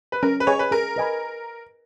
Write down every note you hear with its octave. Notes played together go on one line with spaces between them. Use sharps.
B4
C#4 A#4
B4
G#4 C#5 D#5 G#5 B5
B4
G#4 A#4
B4 D#5 G#5 B5